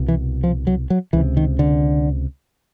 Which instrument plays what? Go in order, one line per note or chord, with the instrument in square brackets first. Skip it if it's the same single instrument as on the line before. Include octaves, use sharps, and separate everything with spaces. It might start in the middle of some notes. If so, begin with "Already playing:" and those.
Already playing: [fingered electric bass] C2 B2
E3
F3
F#3
F#3
C#2 C3 E3
D#3
D3